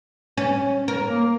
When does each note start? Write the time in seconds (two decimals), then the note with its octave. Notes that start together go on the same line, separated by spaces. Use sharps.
0.37 C#4
0.88 A#4
1.08 A#3